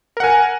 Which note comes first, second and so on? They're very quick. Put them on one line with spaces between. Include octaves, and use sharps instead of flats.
A#4 F#5 G#5